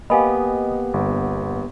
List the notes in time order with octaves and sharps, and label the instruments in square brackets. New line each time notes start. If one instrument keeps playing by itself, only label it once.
[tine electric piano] A#3 B3 G4 [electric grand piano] D#5 [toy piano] F5 G#5 B5
[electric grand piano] G1